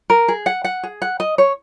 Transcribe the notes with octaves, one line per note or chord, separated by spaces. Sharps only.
A#4
G#4
F#5
F#5
G#4
F#5
D#5
C#5